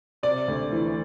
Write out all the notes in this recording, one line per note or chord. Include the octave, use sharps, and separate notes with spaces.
C3 D5
D2
E3